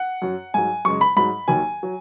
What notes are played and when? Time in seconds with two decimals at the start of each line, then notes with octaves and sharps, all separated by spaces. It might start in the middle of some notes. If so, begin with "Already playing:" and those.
Already playing: F#5
0.22 F#2 F#3
0.54 G#2 F#3 G#5
0.85 F#2 C#3 G#3 C#6
1.01 B5
1.17 G#2 F#3 B5
1.48 D#2 D#3 F#3 G#5
1.83 F#3